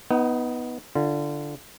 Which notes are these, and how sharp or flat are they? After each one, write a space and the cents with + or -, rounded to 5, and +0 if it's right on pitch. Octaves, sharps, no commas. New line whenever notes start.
B3 +0 D#4 +20 F#5 +45
D3 +0 F4 -35